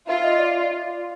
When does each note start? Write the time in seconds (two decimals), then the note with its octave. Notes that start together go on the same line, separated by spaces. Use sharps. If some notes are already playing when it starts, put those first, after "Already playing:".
0.08 F4 E5
0.23 D#5
0.38 D5